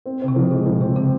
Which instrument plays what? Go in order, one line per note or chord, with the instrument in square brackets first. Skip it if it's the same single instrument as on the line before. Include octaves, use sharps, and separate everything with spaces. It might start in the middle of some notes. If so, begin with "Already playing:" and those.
[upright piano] C4
[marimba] C#3 [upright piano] C4
[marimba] C3
[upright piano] F3
[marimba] C3 [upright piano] G#3
[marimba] A#2 [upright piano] F3
[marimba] C3 [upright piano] C4
[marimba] C#3 [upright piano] C4